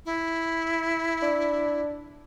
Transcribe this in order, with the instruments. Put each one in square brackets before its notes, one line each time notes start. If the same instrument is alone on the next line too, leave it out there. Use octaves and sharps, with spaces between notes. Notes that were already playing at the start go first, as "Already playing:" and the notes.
[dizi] E4
[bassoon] D4